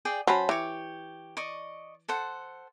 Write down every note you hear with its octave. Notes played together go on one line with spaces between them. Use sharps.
G#4 D5 G5
F#3 C#4 C5 A5 B5
E3 G4 C#5
D5 D#5 C#6
A4 C5 F#5